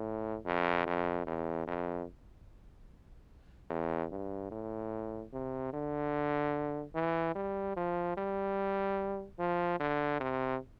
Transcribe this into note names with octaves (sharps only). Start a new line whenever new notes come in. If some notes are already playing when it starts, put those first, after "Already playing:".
Already playing: A2
F2
F2
E2
F2
E2
G2
A2
C3
D3
E3
G3
F3
G3
F3
D3
C3